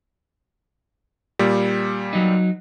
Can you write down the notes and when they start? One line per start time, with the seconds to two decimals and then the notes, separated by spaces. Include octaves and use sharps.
1.39 A#2 G3
2.13 F#3 D#4